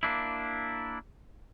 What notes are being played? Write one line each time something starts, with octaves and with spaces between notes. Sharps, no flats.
A#3 D4 E4